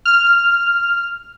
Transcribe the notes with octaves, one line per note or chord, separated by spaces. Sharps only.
F6